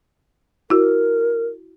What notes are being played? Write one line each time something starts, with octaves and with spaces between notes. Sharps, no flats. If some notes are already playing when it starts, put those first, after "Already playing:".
E4 F#4 A#4